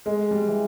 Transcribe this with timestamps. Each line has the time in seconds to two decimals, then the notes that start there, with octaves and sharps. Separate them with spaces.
0.06 G#3
0.31 G3
0.48 E3